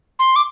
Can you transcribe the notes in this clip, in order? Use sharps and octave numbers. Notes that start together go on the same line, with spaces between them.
C6
D6